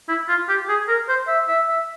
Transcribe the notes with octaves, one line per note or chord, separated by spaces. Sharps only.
E4
F4
G4
G#4
A#4
C5
E5
E5
E5